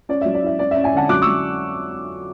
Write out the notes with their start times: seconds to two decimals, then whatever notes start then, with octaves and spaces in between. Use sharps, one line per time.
0.09 C#4 D5
0.21 F#3 E5
0.34 D5
0.43 E4 E5
0.59 C#4 D5
0.71 E5
0.76 C#4
0.84 E5 G#5
0.93 D3 F#5 A5
1.09 F#3 D6 F#6
1.22 F#3 C#6 E6